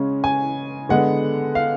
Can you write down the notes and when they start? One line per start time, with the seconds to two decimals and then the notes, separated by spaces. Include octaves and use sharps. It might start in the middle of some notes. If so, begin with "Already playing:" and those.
Already playing: C#3 G#3 C#4
0.24 G#5
0.89 D3 G#3 B3 F#5
1.55 F5